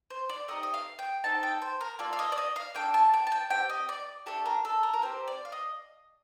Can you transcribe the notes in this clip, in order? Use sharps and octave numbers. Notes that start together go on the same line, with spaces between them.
C5
D5
A3 C4 D#4 G4 D#5
D#5
F5
G5
C4 D#4 A4 A5
G5
C5
A#4
A#3 F4 A4 D5
F5
D#5
D5
D#5
F5
A#3 D4 A4 G5
A5
G5
A5
G5
C4 G4 G5
D#5
D5
A3 D4 G4 A4
A#4
A4
A#4
A#4
C4 G4 C5
D5
F5
D#5